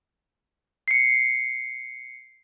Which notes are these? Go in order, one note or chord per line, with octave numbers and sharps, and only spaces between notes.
C7 C#7